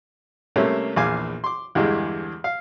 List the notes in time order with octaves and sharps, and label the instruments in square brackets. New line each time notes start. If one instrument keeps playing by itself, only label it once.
[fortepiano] C3 G3 A3 A#3 C#4
A#1 E2 F5 G#5 D6
C6 D6
E2 G2 D3 E3 G#3
F5